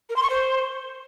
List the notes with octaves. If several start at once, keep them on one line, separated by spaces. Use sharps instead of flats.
A#4
C6
C#6
C5